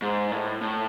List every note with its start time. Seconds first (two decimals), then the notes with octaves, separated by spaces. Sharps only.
0.02 G#2
0.32 A2
0.61 A2